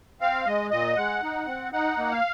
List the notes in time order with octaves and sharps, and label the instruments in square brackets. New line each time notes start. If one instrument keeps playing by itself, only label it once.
[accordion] C4 F5
G#3 D#5
A#2 D#5
G#3 F#5
D#4
C4
D#4 F#5
A#3
F5